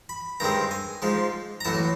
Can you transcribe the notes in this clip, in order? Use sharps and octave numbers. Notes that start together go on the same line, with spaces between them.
B5
G2 D#3 G#3 C4 A#5
G#5
G#2 F3 G#3
A#5
A1 A2 F#3 A5